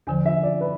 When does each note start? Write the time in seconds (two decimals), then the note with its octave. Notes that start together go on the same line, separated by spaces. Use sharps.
0.07 E2 D3 F3 G#5
0.26 E5
0.43 D5
0.61 B4